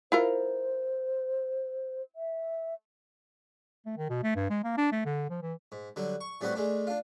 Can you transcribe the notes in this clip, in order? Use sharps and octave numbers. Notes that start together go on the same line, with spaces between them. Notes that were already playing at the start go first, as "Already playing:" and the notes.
E4 F4 A#4 C5
E5
A3
D#3
B2
A3
G2
G#3
A#3
D4
A3
D3
F3
E3
G#2
D3 F#3 G3
C#6
A2 G3 B3 C4 F#4 G4
G#3 A3 D4
D4 F4